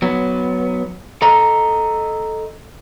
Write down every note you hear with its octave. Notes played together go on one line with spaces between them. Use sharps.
F#3 B3
A4 D#5 A#5